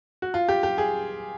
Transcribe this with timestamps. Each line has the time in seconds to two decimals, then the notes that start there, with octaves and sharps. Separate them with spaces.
0.22 F#4
0.34 F4
0.49 G4
0.63 G4
0.78 G#4